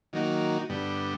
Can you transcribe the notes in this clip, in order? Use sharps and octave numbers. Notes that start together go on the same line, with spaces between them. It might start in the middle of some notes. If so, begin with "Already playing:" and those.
D#3 F#3 A#3 D#4 F#4
G2 D3 G3 B3